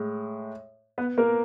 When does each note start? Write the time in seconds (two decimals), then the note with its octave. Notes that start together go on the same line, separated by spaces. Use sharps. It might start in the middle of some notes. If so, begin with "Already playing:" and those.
Already playing: A2 G#3
0.98 B3 B4
1.18 A#3 A#4